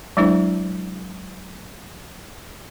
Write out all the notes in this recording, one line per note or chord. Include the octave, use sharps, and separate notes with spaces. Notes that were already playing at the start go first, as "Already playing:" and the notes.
F#3 G#3 D4 E4 C5